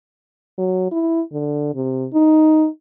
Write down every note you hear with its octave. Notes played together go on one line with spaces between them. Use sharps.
F#3
E4
D3
C3
D#4